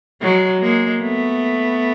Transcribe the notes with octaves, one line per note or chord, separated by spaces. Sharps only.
F#3 G#3
G#3 A#3
A3 B3